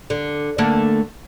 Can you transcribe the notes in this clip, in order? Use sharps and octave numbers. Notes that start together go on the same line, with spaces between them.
D3
D3 A3 A#3